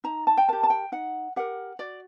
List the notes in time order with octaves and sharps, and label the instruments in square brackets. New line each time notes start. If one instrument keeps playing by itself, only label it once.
[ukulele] D#4 A#5
A5
G5
G4 A#4 A5
A5
G5
D#4 F#5
G4 A#4 F#5
F#4 D5